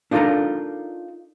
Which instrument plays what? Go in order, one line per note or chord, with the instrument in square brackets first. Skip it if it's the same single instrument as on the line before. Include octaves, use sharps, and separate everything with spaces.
[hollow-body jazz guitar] D4 D#4 F4 A4 A#4 A#5